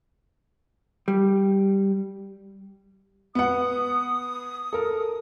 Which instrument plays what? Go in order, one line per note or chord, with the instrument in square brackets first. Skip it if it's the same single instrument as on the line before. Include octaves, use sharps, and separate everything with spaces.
[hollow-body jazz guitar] G3
[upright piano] B3 F#5 [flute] D#6
[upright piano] A4 A#4